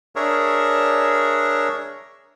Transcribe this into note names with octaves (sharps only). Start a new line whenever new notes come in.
D4 G#4 A#4 C#5 E5